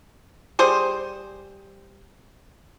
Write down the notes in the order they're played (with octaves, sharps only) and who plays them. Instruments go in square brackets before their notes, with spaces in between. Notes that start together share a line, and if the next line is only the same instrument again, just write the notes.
[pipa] G3 G#4 C5